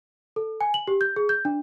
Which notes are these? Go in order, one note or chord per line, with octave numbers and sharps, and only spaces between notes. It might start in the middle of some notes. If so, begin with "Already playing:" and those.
A4
G#5
F#7
G4
G6
G#4
G6
D4